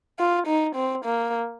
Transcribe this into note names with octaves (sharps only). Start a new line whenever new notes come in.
F4
D#4
C4
A#3